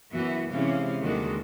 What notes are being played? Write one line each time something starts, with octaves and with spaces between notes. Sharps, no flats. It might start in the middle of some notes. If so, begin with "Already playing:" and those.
F#2 E3 B3 F#4
C3 E3 G#3 C#4 F5
D#2 D3 D#3 G3 G#3 F#4